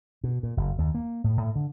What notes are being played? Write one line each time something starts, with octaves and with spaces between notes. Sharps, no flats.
B2
A#2
F#1
D#2
A#3
A2
A2
D3